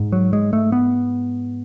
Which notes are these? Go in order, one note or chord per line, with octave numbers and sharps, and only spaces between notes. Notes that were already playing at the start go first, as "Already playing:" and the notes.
Already playing: G#2
F#3
G#3
A3
B3